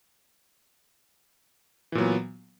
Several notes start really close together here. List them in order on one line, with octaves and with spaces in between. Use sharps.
E3 A#2 F#3 B3